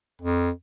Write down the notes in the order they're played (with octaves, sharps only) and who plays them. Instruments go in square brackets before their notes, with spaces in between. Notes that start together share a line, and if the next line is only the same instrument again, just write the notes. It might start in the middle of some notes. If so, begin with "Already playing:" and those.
[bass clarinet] F2